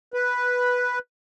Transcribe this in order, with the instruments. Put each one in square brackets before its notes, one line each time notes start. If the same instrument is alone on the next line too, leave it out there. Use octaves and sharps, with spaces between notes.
[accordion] B4